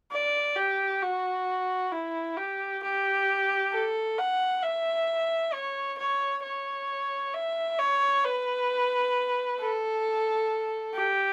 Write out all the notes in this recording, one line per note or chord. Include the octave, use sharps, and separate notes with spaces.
D5
G4
F#4
E4
G4
G4
A4
F#5
E5
C#5
C#5
C#5
E5
C#5
B4
A4
G4